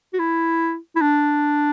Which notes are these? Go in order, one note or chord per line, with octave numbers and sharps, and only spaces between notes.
F#4
E4
E4
D4